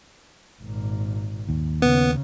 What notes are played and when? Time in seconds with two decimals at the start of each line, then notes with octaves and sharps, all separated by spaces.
0.62 G#1 A#2
1.49 D#2
1.82 C#3 B3